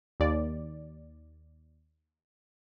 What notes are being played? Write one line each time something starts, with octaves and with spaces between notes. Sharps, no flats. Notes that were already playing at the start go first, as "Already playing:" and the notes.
D#2 D5